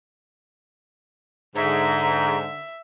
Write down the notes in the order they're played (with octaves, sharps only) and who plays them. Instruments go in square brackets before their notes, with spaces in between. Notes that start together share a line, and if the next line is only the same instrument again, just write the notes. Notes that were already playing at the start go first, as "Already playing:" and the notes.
[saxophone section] G#2 [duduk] D3 [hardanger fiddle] E5 [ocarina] A#5